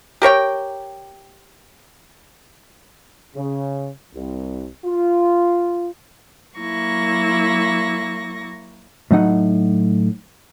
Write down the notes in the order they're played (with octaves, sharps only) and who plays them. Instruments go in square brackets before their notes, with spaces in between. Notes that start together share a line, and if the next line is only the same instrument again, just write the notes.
[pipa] G4 A#4 C#5 G5
[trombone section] C#3
C2
F4
[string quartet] F#3 A#3 E4 C#6 A#6
[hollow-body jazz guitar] A2 F#3 D#4 F#5